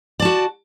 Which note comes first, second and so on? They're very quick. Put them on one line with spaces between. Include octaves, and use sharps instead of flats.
D5 A5 F#4